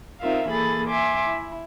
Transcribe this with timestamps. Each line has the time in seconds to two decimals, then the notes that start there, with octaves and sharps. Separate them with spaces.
0.20 C4 D#4 F4 A#4 E5 F5
0.49 E3 A#3 G#4 A4 B5 A6
0.86 E5 G#5 C6 D6
1.25 E4